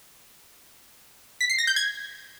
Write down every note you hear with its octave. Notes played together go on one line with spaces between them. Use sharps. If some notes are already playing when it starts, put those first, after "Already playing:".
B6
C7
A#6
G6
G#6